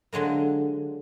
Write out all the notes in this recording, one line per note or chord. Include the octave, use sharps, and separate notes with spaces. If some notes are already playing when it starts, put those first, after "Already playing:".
D3 F#3 G#3 A#3